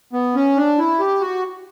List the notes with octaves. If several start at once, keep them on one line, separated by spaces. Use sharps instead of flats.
B3
C#4
D4
E4
G4
F#4